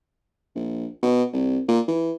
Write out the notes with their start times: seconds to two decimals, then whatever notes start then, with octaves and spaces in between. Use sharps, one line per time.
0.55 A#1
1.03 B2
1.33 C2
1.68 A#2
1.88 E3